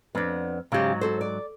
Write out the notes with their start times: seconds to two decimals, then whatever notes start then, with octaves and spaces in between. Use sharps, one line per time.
0.15 F2 B3 D4
0.72 G#2 C#3 F#3 G4
1.01 F#4 A4 C5
1.21 D5